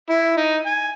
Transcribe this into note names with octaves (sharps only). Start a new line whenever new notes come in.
E4
D#4
G#5